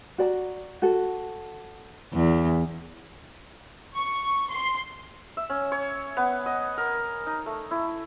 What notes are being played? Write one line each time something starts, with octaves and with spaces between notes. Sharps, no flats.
F#4 D5 A#5
F#4 A4
E2
C#6
C6
E5
C#4
C#5
B3
D#5
A#4
D#4
A3
E4